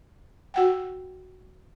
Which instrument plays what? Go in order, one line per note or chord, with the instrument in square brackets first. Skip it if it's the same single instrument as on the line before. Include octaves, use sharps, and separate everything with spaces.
[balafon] F#4 F#5 G5